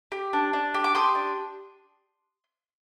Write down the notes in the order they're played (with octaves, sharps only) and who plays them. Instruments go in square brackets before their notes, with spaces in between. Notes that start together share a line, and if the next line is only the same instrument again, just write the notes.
[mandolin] G4
D4
D4
G4
D6
G4 C6 D#6
D4